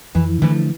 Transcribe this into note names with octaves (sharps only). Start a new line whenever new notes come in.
F2 E3
D3 E3 F3 A3